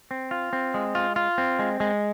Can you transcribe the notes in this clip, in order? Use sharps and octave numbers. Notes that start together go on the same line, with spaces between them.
C4
F4
C4
G#3
F4
F4
C4
G#3
G#3